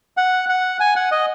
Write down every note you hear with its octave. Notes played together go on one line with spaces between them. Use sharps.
F#5
F#5
G#5
F#5
D#5